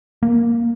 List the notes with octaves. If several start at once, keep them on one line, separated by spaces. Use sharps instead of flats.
A#3